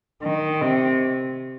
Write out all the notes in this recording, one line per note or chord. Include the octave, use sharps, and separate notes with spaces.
D#3
C3